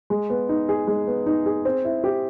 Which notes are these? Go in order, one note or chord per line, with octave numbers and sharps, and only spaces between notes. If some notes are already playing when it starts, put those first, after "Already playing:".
G#3
B3
D#4
G#4
G#3
B3
D#4
G#4
C4
E4
G4